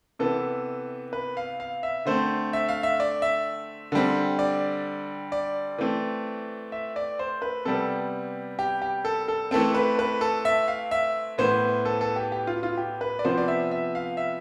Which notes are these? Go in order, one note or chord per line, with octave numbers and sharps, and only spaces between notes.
C3 E3 B3 A4
B4
F5
F5
E5
D3 A3 C4 C5
E5
F5
E5
D5
E5
D3 G3 C4
D5
D5
E3 A3 C4
E5
D5
C5
B4
C3 G3 B3 A4
G4
G4
A4
A4
E3 A3 C4 A4
B4
B4
A4
E5
F5
E5
A2 E3 B3 C5
A4
A4
G4
G4
F4
F4
G4
B4
D5
C3 F3 B3 C5
D5
E5
E5
F5
E5